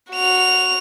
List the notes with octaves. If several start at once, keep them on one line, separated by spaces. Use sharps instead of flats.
F#4 F7